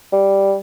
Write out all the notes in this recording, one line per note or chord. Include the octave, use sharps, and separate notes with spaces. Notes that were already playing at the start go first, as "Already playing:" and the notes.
G3